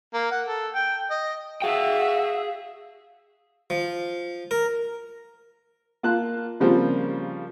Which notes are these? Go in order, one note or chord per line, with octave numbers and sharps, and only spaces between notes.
A#3
F#5
A4
G5
D#5
F#4 G#4 E5 F5 G5
F3
A#4
A#3 F4 A5 F#6
C#3 F3 G3 A#3 C4